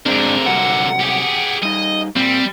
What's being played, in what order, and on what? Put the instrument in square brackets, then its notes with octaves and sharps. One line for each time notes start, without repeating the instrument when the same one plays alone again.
[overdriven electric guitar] G#2 D4 [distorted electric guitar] D3 A#4 [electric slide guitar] C4 G#4 C5
[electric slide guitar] C3 F#3 G3 [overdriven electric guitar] F#5
[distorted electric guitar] G4 G#4
[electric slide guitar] G3 D#4 [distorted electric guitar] D#5
[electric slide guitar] A#2 [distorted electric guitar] G3 [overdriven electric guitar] C4